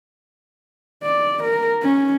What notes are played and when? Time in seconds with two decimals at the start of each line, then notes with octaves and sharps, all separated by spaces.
1.03 D5
1.43 A#4
1.83 C#4